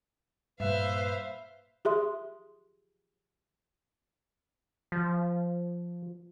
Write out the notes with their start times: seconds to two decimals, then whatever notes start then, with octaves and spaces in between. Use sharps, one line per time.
0.60 G2 A#2 B4 C5 E5 F5
1.85 G4 G#4 E5 C6 D#6
4.92 F3